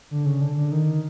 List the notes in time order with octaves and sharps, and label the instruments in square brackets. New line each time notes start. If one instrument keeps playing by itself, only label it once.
[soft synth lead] D3
C#3
D3
D3
D#3